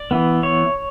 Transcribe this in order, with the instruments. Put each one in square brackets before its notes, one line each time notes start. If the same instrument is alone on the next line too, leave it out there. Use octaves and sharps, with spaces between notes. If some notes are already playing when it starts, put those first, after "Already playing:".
Already playing: [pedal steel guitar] D5
E3 B3
C#5